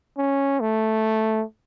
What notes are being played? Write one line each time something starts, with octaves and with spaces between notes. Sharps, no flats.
C#4
A3